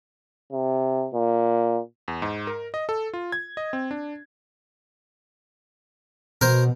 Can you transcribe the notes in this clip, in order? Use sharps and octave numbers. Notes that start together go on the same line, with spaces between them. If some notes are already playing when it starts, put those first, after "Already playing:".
C3
A#2
E2
G#2
A#4
D#5
A4
F4
G#6
D#5
C4
D4
B2 A#4 C5